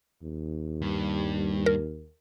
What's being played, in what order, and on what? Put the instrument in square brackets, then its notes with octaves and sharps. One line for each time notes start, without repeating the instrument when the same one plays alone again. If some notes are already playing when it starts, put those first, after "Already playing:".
[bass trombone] D#2
[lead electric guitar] G2
[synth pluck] A#4